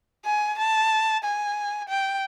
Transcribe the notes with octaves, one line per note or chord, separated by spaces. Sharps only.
G#5
A5
G#5
G5